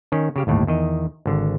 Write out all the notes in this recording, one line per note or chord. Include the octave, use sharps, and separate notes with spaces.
D#3 C#4
C#3 G4 F5
G1 D#2 A2
E2 D#3 D#5
G#1 D3